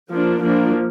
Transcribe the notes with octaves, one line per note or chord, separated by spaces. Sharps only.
F3 A#3 D4
F3 A#3 D4